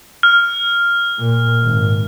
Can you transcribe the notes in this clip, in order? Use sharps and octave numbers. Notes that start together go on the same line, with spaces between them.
F6
A#2
G#1